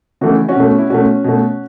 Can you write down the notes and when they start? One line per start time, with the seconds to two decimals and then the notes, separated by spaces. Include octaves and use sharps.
0.21 C#3 E3 A3 F#4
0.35 E4
0.48 C#4 F#4
0.55 B2 A3
0.79 E4
0.90 B2 A3 C#4 F#4
1.24 B2 A3